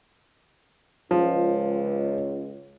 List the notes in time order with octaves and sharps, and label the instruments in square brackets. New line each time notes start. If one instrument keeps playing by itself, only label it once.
[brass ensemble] C#2 [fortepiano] F3